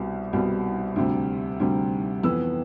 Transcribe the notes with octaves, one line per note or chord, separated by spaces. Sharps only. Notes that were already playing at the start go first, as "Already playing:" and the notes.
Already playing: C2 B2 G3
C2 B2 G3
D2 C3 G3
D2 C3 G3
F2 E3 B3 E6